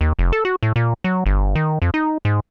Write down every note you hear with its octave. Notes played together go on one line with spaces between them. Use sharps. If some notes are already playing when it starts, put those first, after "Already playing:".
D#2
F1
A4
F#4
A2
A#2
F#3
G1
D#3
F2
D#4
G#2